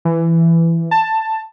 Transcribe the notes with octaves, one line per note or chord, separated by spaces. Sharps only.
E3
A5